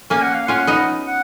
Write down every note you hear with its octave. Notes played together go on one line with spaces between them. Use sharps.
A#3 C#4 G#5
F#5
F5
C#4 F4 F#5
B3 D#4
F#5